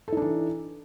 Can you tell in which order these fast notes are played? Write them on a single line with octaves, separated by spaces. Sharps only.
A4 D#4 D4 E3